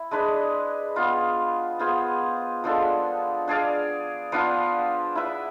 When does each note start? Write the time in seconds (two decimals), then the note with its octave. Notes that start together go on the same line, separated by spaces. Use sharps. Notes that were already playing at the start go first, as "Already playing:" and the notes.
Already playing: E4
0.11 G#3 D4 G#4 B4
0.96 B3 F4 G#4
1.79 B3 F4 G#4 C5
2.64 F3 G#3 D4 A4
3.48 D4 G#4 D5 F5
4.32 F3 B3 D4 F4
5.15 E4 B4 E5